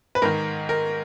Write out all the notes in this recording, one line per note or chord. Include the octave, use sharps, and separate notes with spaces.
B4
G#2 D#3 A#4
A#4